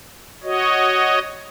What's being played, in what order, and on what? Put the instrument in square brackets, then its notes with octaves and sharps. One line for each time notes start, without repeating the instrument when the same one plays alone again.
[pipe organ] F#4 C#5 D#5